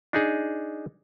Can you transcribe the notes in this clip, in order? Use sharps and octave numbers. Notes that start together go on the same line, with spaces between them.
D4 D#4 G#4